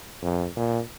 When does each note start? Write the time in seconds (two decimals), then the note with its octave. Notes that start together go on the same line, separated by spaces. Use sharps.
0.22 F2
0.56 A#2